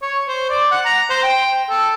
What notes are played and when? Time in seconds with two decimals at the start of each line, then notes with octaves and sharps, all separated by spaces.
0.02 C#5
0.28 C5
0.50 D5
0.72 F#5
0.86 A#5
1.10 C5
1.23 G5
1.70 A4